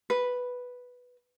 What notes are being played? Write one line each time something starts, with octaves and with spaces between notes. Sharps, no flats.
B4